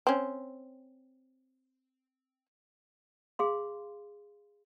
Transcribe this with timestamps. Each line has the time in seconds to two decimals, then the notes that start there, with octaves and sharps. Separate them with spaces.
0.07 C4 C#4
3.39 G#4 F5 C6